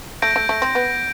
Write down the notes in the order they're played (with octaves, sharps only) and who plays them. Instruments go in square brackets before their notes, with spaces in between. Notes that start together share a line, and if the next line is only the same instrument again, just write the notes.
[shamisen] A3 [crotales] G6 A#6 D7
[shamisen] A3
A3
C4
B3